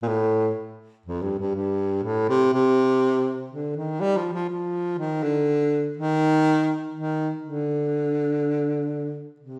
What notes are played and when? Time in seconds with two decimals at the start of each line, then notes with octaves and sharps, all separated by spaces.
0.02 A#2
0.08 A2
1.06 F2
1.22 G2
1.39 G2
1.55 G2
2.04 A2
2.29 C3
2.53 C3
3.51 D3
3.76 D#3
4.01 G3
4.17 F3
4.33 F3
4.50 F3
4.98 D#3
5.23 D3
5.97 D#3
6.95 D#3
7.44 D3
9.40 C3